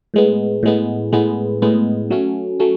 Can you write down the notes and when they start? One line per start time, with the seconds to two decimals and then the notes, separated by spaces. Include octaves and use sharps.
0.14 A2 G#3 B3
0.63 A2 G#3 B3
1.13 A2 G#3 B3
1.62 A2 G#3 B3
2.11 F#3 A3 C#4
2.60 F#3 A3 C#4